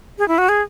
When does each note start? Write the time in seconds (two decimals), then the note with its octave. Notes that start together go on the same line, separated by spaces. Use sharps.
0.18 G#4
0.28 E4
0.38 F#4
0.49 G#4